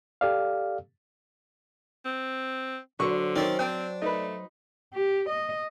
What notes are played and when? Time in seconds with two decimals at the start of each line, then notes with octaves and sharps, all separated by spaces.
0.21 G4 A4 D5 F5
2.05 C4
3.00 D3 F#3 C5 C#6
3.36 D#3 C4 C#4 D5
3.59 C4 D4 G5
4.02 A3 D#4 B4
4.94 G4
5.29 D#5